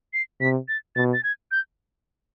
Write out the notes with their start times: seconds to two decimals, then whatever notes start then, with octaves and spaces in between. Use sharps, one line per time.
0.13 C7
0.40 C3 B6
0.68 A6
0.96 B2 A6
1.13 A6
1.24 G#6
1.51 G6